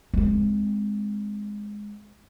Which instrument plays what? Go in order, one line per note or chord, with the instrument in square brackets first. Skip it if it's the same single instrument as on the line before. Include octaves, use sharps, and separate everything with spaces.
[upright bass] G#3 C4